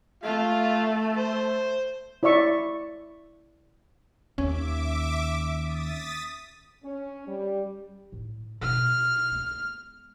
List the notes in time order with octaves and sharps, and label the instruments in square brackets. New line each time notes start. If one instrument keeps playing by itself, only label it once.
[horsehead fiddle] A3 [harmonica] F4 F5
[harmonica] C5
[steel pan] E4 C#5 D5 E5 C#6
[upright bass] D#2 [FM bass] C#4 [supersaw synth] E5 D6
[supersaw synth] D#6 A6 B6
[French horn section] C#4
G3
[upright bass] A2
[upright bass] B2 C4 [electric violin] F6
[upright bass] G#3 B3